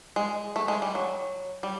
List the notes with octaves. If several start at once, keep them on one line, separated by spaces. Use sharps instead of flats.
G#3
A3
G#3
G3
F#3
G3